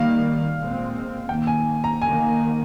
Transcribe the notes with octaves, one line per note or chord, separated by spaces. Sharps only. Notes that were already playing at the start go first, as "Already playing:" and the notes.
Already playing: D#3 G3 A#3 F5
A#2 G#3 C4
D#3 A#3 G5
G#5
A#5
D#3 A#3 G#5